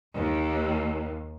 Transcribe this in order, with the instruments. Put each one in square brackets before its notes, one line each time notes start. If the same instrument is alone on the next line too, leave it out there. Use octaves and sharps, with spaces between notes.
[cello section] D#2